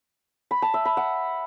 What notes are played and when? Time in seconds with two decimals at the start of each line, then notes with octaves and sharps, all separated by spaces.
0.51 B5
0.62 A5
0.74 E5
0.85 B5
0.97 F#5